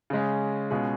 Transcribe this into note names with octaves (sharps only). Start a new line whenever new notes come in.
C#3 G#3 C#4
B2 G#3 C#4 F4 G#4